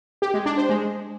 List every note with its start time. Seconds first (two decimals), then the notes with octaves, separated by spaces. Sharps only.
0.22 G4
0.34 G#3
0.46 D4
0.58 C5
0.69 G#3